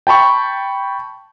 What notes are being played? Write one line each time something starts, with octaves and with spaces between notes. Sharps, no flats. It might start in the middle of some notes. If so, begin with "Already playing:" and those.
G5 A5 B5 C#6